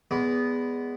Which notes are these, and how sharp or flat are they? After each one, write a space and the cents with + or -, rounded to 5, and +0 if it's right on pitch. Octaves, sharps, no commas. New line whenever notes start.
G#3 -10 B3 +0 D5 -30